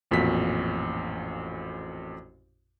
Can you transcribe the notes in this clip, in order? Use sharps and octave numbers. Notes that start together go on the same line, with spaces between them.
A1 F2 A#2 F#4 B6